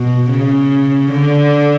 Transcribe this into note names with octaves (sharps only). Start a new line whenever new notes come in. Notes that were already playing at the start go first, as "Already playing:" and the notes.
Already playing: B2
C#3
D3